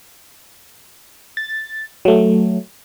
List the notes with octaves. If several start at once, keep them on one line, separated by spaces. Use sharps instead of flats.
A6
F#3 A3